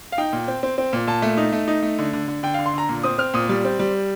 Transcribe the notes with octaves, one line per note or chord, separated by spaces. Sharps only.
F5
D#4 G5
A#2
C4
C4
C4
A#2
A#2 A5
A3
D#4
A3
D#4
A3
D3
D3
D3
D3 G5
D3 F5
C6
D3 A#5
A#2
C4 D#6
C4 F6
A#2 D#6
G3
C4
G3